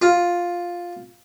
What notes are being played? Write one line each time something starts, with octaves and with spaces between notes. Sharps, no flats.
F4